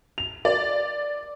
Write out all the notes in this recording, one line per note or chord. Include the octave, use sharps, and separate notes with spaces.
F7
D5